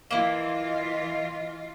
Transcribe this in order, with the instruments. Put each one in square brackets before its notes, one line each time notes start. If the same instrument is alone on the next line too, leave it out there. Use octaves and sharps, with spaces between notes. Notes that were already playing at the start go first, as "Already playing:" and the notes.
[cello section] E3 F4 [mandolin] A#3 E4 [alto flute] D#5